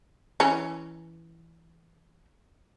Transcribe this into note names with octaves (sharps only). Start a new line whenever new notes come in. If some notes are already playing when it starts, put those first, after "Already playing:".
E3 C#4